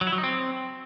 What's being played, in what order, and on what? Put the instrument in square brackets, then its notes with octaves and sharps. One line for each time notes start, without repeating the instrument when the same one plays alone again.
[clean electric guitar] F#3
E4
F#3
D#4
C4